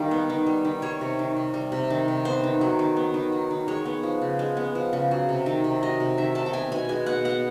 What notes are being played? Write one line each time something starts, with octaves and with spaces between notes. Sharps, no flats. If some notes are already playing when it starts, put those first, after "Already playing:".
Already playing: D#3 G3 F5
B3
D#3
G3
D#3
G3 C#5
C3
D#3
C3
G3
C3
D#3
C3
B3 C5
D#3
F#3
D#3
B3
D#3
F#3
D#3
G#3 C#5
B3
F3
C#3
G#3
B3
F3
C#3
F#3
C3
D#3
C3
F#3 D#5
C3
D#3 E5
C3 A5
G5
B3 G#5
B2 G#5
G#3 G#5
B2 F#5
B3 F#5